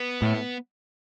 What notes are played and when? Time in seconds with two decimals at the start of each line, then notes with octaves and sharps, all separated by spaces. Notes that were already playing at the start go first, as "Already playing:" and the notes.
Already playing: B3
0.22 A2